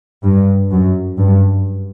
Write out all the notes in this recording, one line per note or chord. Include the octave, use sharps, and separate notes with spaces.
G2
F#2
G2